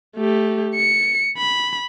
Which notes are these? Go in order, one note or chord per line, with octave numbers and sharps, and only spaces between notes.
A3 G4
C#7
B5